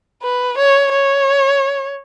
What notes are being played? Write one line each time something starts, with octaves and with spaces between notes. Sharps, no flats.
B4
C#5
C#5